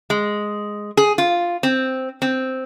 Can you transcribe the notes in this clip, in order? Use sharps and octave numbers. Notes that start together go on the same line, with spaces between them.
G#3
G#4
F4
C4
C4